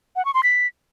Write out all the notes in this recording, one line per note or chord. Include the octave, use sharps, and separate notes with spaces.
F#5
C#6
C6
B6